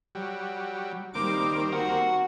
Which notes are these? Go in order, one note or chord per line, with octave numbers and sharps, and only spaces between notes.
F#3 G3
D#3 G3 A#3 C4 D6
F#4 F#5